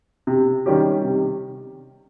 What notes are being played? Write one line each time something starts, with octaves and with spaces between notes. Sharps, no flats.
C3
D#3 G3 C#4 G4
C3